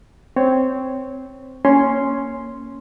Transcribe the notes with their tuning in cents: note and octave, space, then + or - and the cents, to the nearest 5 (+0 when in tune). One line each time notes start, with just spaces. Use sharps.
C4 -5 C#5 +0
A#3 +0 C#4 +0 C6 +0